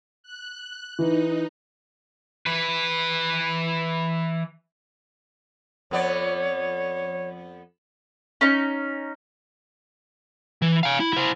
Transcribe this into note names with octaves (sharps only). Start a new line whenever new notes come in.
F#6
E3 D#4
E3 B4
F2 B3 C#5 D5
C#4 D#4
E3
F5 G#5
E4
E4 C5